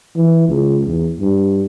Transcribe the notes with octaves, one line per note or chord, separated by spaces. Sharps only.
E3
C#2
E2
G2